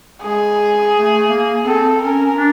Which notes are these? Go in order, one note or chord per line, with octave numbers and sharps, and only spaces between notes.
G#3 G#4
A3
A#3
C4 A4
C#4 A#4
D4